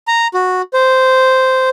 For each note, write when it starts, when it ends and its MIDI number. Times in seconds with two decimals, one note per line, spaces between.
0.08 0.27 82
0.34 0.62 66
0.74 1.69 72